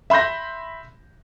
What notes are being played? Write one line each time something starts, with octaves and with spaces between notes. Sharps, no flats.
E5 B5 C6 G6 A#6